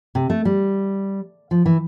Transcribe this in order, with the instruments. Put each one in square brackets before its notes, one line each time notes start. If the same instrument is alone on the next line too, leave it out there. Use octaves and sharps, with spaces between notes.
[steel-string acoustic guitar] C3
A3
G3
F3
E3